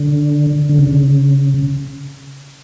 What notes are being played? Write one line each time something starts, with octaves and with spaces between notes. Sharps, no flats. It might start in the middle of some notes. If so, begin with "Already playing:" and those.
Already playing: D3
D3
C#3